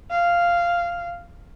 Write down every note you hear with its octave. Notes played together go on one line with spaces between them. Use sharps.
F5